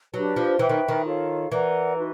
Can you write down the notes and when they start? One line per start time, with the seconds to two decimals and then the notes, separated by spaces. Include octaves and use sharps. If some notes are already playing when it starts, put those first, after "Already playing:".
0.13 F#3 D4 G4 B4
0.36 F3
0.59 E3 B4 E5 G5 B5
0.69 D#3
0.88 D#3
1.05 F4 A4 C#5 F5
1.51 E3 A#4 D5 F#5 A#5
1.97 D#4 F#4 B4